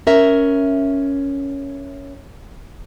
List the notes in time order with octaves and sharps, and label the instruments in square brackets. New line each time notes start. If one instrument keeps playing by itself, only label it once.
[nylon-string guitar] C#4 A#4 E5